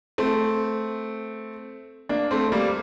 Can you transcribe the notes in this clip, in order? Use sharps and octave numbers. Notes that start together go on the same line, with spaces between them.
A3 C4
A#3 D4
A3 C4
G3 A#3